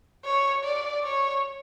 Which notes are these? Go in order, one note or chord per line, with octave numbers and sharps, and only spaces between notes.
C#5
D5
C#5